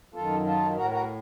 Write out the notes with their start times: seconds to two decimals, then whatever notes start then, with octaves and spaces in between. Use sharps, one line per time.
0.14 F#2 D#3 F4 A4
0.45 F4 A4
0.76 A2 F#4 A#4
0.91 F#4 A#4